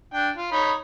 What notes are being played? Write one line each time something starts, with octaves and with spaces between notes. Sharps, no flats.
D4 G5
F4
D#4 C#5 B5